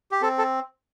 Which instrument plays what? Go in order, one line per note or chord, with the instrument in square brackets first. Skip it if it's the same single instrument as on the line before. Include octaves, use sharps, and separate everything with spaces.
[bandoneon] G4
C4 A4
A4